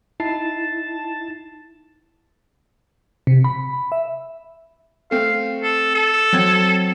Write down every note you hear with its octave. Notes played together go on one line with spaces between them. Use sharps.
D#4 E4 A5 C7
C3
B5
E5
A3 C4 F5
A4
A4
F#3 C4 G#6